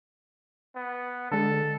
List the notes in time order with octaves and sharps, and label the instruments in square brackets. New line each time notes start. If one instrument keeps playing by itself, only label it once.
[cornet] B3
[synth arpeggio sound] D3 G#3 [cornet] A4